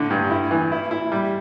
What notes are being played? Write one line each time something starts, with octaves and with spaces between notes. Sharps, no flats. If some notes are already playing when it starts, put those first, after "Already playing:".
Already playing: A2 D3
G2
E4
E3
E4
E4
G3